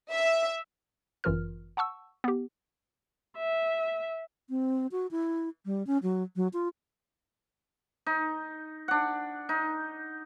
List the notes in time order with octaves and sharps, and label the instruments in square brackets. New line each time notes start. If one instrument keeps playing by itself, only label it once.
[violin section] E5
[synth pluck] G1 F#2 E3 F4 A#4 F6
F#5 A5 C#6 E6
B3 G4
[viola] E5
[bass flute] C4
F#4
E4
G3
C#4
F#3
F#3
F4
[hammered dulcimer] D#4
D4 F#5
D#4